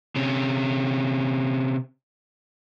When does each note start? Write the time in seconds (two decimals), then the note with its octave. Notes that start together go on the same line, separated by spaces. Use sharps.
0.16 C3 C#4